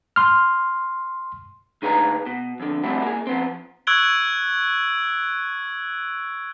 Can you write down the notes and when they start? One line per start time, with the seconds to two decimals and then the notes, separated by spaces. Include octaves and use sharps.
0.16 C6 F6
1.82 D2 D#4 G#4 B4 F5 A#5
2.26 B2
2.60 F2 D3
2.84 G3 A3 C4 E4 F#4
3.02 A#3 G#4
3.27 F3 B3 C4
3.87 C#6 E6 F#6 G#6 D7 G7